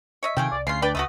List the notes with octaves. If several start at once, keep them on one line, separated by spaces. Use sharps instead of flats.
C#5 D#5 E5
C3 D#3 F3 A3 G#4 G5
C2 D5
D2 C#3 F4 C7
D4 B4 D5 G5
C#2 A3 D4 F#4 D#6